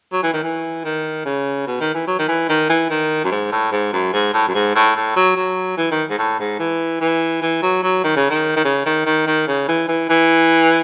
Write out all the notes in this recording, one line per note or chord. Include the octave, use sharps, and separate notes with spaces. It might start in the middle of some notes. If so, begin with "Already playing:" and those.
F#3
E3
D#3
E3
D#3
C#3
B2
D#3
E3
F#3
D#3
E3
D#3
E3
D#3
F#2
G#2
A2
G#2
F#2
G#2
A2
F#2
G#2
A2
A2
F#3
F#3
E3
D#3
G#2
A2
G#2
E3
E3
E3
F#3
F#3
D#3
C#3
D#3
D#3
C#3
D#3
D#3
D#3
C#3
E3
E3
E3